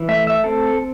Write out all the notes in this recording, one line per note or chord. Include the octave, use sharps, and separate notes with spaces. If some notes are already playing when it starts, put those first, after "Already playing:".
Already playing: E3
A3 E5
E5
C4 A4